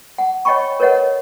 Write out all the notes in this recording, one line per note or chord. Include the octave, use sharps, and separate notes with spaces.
F#5
C#5 D#5 F#5 G5 B5 C#6
A#4 B4 C#5 D#5 F#5